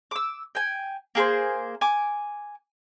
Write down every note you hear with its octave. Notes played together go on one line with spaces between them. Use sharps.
D6 E6
G5 G#5
A#3 G#4 A4 C5
G#5 D6